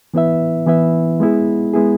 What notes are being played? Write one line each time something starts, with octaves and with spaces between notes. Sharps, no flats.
E3 B3 E4 B4 E5
E3 B3 E4 B4 E5
G#3 B3 E4 G#4
G#3 B3 E4 G#4